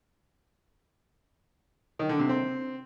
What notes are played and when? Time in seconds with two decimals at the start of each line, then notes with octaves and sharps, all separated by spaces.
1.99 D#3
2.09 D3
2.19 C3
2.29 C4